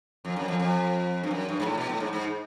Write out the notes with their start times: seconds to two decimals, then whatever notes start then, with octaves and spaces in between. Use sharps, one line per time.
0.25 F2
0.36 F#2
0.48 F2
0.60 F2
1.23 G2
1.31 F#2
1.49 G2
1.60 G#2
1.65 A2
1.78 B2
1.89 A2
2.00 G#2
2.13 G#2